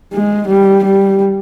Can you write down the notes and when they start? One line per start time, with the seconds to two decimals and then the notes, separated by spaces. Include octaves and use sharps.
0.13 G#3
0.48 G3
0.84 G3